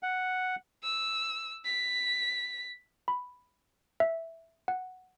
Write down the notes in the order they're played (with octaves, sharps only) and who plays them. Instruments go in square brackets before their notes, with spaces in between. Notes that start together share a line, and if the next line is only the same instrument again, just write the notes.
[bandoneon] F#5
[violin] E6
B6
[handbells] B5
E5
F#5